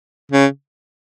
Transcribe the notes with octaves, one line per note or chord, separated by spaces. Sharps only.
C#3